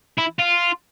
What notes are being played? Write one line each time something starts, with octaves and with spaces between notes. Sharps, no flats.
E4
F4